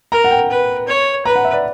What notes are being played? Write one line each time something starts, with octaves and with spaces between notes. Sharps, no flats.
A#4 A#5
F#5
G5
B4
C#5
B4 A#5
F#5
E5
D5